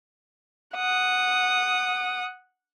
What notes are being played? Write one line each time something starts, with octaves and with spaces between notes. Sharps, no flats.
F#5 D#6